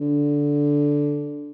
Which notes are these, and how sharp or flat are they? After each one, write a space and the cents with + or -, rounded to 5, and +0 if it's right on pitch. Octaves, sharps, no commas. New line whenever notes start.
D3 -10